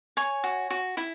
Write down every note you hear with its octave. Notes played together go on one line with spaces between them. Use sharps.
C#5 G#5
F#4
F#4
E4